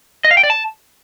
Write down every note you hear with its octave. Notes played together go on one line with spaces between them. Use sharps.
D#5
F5
G5
D5
A5